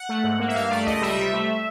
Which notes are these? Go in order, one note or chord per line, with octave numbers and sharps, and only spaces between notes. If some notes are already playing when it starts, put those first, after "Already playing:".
Already playing: F#5
A3
G#2
A#3
E5
G2 F5
A3 D5
C#2 D#5
G3 E5
C3
A3